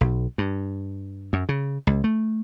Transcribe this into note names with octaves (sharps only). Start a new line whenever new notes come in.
B1
G2
F#2
C#3
C#2
A3